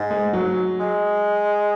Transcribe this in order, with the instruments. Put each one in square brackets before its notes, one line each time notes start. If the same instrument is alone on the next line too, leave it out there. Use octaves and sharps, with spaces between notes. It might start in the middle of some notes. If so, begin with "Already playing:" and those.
Already playing: [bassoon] G#2
[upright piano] G#3
F#3
[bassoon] G#3